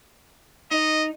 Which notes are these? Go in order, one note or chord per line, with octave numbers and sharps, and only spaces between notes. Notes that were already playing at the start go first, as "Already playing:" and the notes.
D#4 D#5